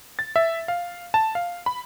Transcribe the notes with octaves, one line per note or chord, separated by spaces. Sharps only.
A6
E5
F5
A5
F5
B5